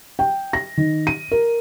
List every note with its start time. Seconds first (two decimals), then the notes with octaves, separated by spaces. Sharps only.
0.19 G5
0.53 A#6
0.77 D#3
1.07 D#7
1.32 A#4